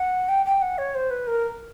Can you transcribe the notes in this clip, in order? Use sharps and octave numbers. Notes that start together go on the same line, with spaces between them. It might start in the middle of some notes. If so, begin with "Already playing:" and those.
Already playing: F#5
G5
G5
F#5
C#5
C5
B4
A#4